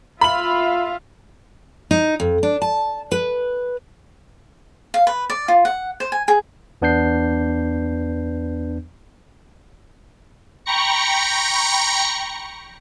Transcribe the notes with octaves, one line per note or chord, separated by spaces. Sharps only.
F4 E5 F5 B5 F#7
D#4
F2
D4
A5
B4
F5
B4
D5
F4
F#5
C5
G#5
G#4
E2 B3 D4 B4 G6 C7
G5 A#5 B5 C#6 A#6 C#7